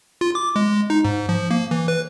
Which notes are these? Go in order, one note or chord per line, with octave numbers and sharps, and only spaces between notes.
F4
D6
G#3
D#4
G#2
F3
A#3
E3
B4